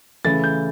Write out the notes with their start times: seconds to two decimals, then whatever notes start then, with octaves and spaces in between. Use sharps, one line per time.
0.25 C#3 E3 A3 E4 A6
0.44 G6